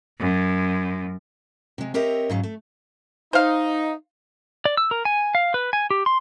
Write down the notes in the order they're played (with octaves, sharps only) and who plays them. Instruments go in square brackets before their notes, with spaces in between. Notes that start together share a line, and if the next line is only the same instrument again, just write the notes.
[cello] F#2
[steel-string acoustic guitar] C3 G#3
C4 G4 A#4 C#5 D#5 E5
G#2 C#3 F#3
A3
[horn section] D#4 [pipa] C5 F5
[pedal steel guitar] D5
E6
A#4
G#5
F5
B4
G#5
G4
C6